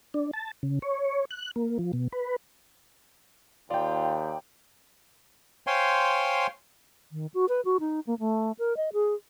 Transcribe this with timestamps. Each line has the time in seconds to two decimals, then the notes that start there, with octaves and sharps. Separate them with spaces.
0.14 D4
0.33 A5
0.63 C#3
0.82 C#5
1.31 F#6
1.56 A#3
1.79 F3
1.93 B2
2.12 B4
3.70 D#2 F4 D5 G5
5.67 C5 C#5 F5 G5 G#5 C6
7.12 D#3
7.34 F#4
7.49 B4
7.65 F#4
7.80 D#4
8.07 A#3
8.19 A3
8.59 A#4
8.77 D#5
8.93 G#4